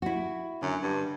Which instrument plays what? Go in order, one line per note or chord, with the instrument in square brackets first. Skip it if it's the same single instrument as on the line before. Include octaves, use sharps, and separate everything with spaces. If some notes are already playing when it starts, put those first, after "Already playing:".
[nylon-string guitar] E4 F#4
[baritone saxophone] F#2 [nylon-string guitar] D3
[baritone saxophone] G2